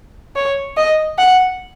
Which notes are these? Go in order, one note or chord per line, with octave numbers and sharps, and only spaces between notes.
C#5
D#5
F#5